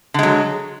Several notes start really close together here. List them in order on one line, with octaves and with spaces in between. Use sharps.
D3 G#3 F#3